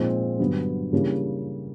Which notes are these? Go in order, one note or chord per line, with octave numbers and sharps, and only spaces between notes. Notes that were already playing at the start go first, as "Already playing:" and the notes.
Already playing: A#2 F3 G#3 C4 D#4
G2 D3 F#3 B3
C#3 E3 G3 A#3 D4